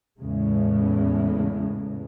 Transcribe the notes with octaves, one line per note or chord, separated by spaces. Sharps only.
E2 A2 C#3 G#3